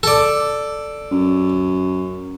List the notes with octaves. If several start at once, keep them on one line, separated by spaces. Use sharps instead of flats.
A4 D5
F#2